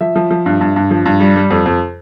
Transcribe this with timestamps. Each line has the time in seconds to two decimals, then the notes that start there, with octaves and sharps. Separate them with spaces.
0.01 F3 E5
0.16 F3
0.31 F3
0.46 G2
0.61 G2
0.76 G2
0.91 F3
1.06 G2
1.20 G3
1.36 G3
1.51 F2
1.66 F2